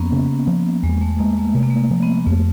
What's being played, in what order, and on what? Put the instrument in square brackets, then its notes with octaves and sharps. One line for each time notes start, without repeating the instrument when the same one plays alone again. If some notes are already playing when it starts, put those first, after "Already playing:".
Already playing: [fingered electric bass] F2 [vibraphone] A#3 B3 C#4
[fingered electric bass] C#3
F3
[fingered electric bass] E2 [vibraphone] G#3
[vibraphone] A3
[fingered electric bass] G#3 [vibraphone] A#3
[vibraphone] A3
[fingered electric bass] C3 [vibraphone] A3
[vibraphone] A#3
A3
A#3
[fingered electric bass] F3
[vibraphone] B3
[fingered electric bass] F2 [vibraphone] A3